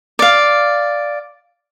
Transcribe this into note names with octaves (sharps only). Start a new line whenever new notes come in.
D5 F5